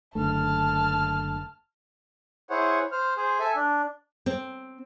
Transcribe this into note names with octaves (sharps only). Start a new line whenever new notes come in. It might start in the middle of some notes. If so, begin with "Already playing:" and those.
F#1 D3 A3 A5 F6
E4 G#4 C5 C#5 F#5
C5 F6
G#4 C5
A4 E5 G#5
D4
C4